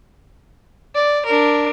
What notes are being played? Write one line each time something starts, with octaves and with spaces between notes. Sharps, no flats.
D5
D4 A#4